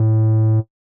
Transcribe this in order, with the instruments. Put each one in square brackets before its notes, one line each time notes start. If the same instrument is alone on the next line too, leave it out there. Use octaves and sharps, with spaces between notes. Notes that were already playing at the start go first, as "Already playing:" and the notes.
Already playing: [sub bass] A2